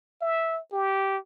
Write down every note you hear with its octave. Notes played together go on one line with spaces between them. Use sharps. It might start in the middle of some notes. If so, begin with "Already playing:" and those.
E5
G4